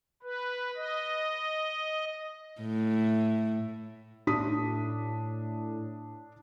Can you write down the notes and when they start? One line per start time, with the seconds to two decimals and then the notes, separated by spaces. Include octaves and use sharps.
0.23 B4
0.76 D#5
2.61 A2
4.27 A2 D4 D#6 B6